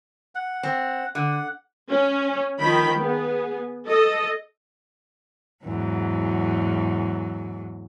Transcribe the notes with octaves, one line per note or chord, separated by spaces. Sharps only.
F#5
C4
D3 F#5
C#4
D#3 F3 G5 B5
B3 G#4
A4 D#5
E2 G#2 F#3